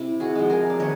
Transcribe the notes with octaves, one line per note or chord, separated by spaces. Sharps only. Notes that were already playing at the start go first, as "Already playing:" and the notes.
Already playing: C3 E4
F#4 G#4
F3 G#3
G#4 A#4
D5
D#3 B4 C#5